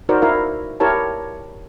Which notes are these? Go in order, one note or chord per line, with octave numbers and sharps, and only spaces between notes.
D#4 F#4 A#4 C5 D5
E4 A#4 F5
E4 G4 A#4 C#5 A5